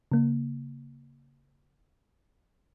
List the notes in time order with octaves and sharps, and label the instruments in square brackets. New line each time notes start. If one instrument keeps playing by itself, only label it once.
[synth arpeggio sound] C#3 A#3